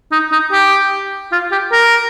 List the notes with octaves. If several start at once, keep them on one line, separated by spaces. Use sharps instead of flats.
D#4
D#4
G4
F4
G4
A#4